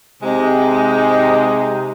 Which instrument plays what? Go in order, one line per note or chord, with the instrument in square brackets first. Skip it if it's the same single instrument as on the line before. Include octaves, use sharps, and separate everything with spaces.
[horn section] C3 G#3 D#4